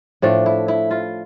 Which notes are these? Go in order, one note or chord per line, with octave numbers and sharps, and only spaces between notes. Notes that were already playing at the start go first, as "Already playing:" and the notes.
A2 F3 A3 D4
E4
E4
F4